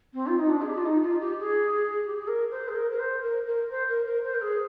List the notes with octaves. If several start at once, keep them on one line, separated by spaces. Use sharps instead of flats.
C4
F4
D#4
D4
G#4
G4
F4
D#4
F4
G4
G#4
G4
G#4
A#4
C5
G#4
A#4
A#4
C5
A#4
A#4
C5
A#4
A#4
C5
A#4
G#4